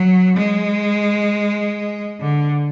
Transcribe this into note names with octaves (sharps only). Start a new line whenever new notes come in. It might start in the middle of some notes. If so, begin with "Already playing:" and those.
Already playing: F#3
G#3
D3